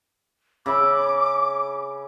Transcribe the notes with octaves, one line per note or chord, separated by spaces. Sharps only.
C#3 E5 B5 D6